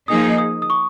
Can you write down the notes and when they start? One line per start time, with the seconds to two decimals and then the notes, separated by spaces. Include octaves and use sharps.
0.08 F3 A#3 D#4 G#4 D#6
0.38 D#6
0.62 D#6
0.70 C#6